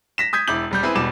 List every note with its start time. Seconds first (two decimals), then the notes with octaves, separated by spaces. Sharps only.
0.18 A#6 B6 E7
0.33 D#6 G6 G#6 B6
0.48 E1 E4 D6 G6 F#7
0.71 E1 G3 G6
0.83 C4 E4 G#4 B4
0.95 E1 B2 G3 D6 E7